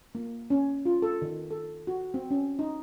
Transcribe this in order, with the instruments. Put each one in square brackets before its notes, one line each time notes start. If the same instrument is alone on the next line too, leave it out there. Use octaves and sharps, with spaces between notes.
[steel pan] A#3
C#4
F4
A4
D#3
A4
F#4
C4
C#4
D#4